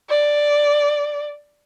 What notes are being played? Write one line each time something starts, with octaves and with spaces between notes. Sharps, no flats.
D5